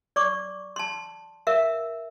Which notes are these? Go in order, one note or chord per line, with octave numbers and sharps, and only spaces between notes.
D5 C#6 D6
A5 C6
A#4 E5 F5